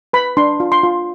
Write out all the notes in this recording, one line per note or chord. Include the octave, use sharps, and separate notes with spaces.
B4 B5
D4 C6
F4
C6
F4